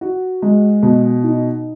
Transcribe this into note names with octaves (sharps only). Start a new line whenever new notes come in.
F#4
G#3
B2
D#4